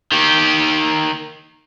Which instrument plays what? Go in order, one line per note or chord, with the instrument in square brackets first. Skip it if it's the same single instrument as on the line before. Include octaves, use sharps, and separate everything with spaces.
[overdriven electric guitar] D#3 G4